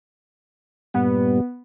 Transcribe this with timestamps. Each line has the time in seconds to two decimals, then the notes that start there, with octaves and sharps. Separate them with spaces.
0.94 G2 A#2 G3 B3